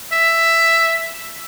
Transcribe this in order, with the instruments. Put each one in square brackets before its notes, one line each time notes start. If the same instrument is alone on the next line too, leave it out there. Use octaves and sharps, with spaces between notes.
[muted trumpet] E5